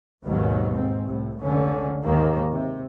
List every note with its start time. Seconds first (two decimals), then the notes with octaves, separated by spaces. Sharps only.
0.24 G#1 D#2 G#2 B2 D#3 F#3
0.72 G#2 C4
1.05 C2 A2
1.39 F1 C#2 D3 C#4
2.04 D#2 G#2 D#3 A#3
2.51 C3